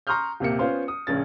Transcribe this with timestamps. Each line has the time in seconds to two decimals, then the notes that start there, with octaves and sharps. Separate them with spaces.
0.07 A#5 C6 C#6 D#6 F6 G6
0.40 D#1 C3 A#3 C#7
0.59 B3 C#4 F4 C5 F5 C6
0.88 D#6
1.07 A#1 C#3 C#4 A6